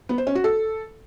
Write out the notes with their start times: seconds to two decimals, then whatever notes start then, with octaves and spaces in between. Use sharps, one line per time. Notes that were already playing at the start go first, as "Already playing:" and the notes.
0.09 B3
0.18 C5
0.27 C#4
0.35 F#4
0.44 A4